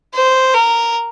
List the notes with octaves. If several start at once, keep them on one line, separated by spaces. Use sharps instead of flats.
C5
A#4